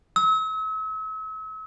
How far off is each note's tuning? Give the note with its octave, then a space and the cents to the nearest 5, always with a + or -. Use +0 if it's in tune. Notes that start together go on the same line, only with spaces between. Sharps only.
E6 -40